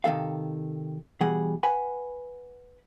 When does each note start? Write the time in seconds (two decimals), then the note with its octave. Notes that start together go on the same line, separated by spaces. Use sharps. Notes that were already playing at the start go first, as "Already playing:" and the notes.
0.04 C3 D#3 A3 A4 F5
1.21 B2 E3 G3 G#4 F#5
1.63 B4 F#5 G#5 B5